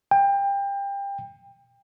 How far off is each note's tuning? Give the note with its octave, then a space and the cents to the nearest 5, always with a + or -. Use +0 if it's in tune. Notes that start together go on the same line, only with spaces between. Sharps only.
G5 +25